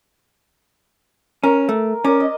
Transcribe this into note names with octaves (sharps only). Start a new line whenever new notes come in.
C#4 A#4
A3
C#4 A#4 D5
D#5